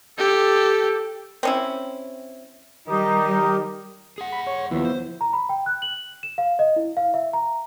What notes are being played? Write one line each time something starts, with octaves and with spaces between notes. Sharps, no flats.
G4 A4
C4 C#4 E4
D#3 G3 D#4 G4 A#4 D#5
G#4 F#5
B5
C#5
D#2 F3 B3 E4
C5
A#5
B5
G5
F#6
F#7
E7
F5
D#5
E4
F5
E5
A#5